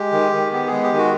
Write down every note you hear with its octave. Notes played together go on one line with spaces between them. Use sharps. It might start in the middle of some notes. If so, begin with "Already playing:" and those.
Already playing: G#3 G4
D#3
D#3
B3 G4
G#4
G#3
G4
D#3
F#4